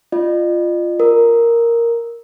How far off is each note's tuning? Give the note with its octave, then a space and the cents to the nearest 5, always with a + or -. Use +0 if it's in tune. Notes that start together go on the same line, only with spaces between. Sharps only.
F4 -5 D#5 -45
A#4 +0 D#6 +0